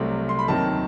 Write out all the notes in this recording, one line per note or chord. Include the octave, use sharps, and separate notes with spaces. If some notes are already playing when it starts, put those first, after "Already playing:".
Already playing: C2 C3 F#3 A3 C4
C6
B5
D#2 D#3 F#3 C4 A5